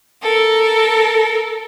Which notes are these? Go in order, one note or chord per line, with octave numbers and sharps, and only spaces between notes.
A4 A#4